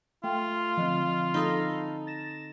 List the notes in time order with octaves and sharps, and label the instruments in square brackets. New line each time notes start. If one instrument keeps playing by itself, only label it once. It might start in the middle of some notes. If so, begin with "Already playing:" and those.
[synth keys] A3 [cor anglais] F4 [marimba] G5
[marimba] D3 C4 D#5 [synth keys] F3
[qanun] D#4 A4 [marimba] B5 D#6
[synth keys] A6 A#6 E7